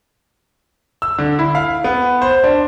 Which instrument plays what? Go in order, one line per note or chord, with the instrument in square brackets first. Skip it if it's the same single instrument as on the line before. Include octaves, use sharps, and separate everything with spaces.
[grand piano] E6
D3
E4
F5
B3
C5
D4